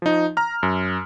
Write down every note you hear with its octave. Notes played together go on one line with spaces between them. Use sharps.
F3 D#4
A#5 F6
F#2